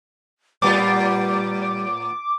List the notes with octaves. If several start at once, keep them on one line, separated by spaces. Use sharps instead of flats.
A2 G3 B3 F4 D6